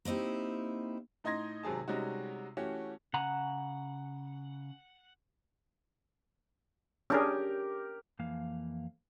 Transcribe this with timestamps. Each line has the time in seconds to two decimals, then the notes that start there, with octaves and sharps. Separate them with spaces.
0.05 A#3 C4 D#4 E4 G4
1.24 A2 D#4 D#5 C6 G#6 A#6
1.63 G#1 C3 F#3 G#4 A5
1.88 C3 G3 G#3 C#4 D#4 F#4
2.57 E3 A3 C#4 F#4 G4
3.14 C#3 F#5 G#5 A#5
7.10 C#4 D4 G4 G#4 A#4
8.19 F2 E3 A#3 F5